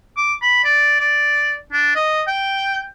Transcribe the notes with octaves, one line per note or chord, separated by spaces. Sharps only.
D6
B5
D5
D5
D4
D#5
G5